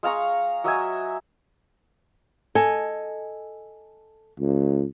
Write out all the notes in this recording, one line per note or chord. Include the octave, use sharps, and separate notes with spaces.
G#3 F5 A#5 C#6
F#3 D#5 E5 G#5
A4 D#5 G#5
C#2